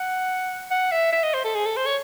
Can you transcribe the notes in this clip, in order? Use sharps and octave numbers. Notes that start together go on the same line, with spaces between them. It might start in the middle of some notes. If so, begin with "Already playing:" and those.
Already playing: F#5
F#5
E5
E5
D#5
C5
A4
G#4
A4
C5
C#5